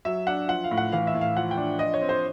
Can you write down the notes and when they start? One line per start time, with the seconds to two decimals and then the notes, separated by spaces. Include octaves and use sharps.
0.05 F#3 E5
0.27 D4 F#5
0.48 F3 F#5
0.64 F5
0.71 A2
0.77 F#5
0.92 E3 F5
1.07 E5
1.15 A2
1.21 F5
1.36 F3 F#5
1.51 G5
1.57 D4
1.79 F3 D#5
1.94 C#5
2.01 C4
2.09 C5